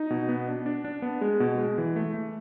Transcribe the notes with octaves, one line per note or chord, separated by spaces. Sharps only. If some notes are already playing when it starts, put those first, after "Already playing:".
Already playing: D#4
B2
B3
D4
D4
D4
B3
G#3
B2
G#3
E3
A3
A3